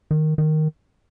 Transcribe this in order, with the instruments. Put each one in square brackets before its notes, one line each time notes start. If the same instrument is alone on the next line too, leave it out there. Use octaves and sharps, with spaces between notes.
[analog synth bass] D#3
D#3